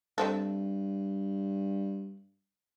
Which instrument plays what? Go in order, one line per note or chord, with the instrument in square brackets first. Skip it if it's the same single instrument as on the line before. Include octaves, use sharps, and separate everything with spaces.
[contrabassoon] G2 [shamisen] A3 C4 A4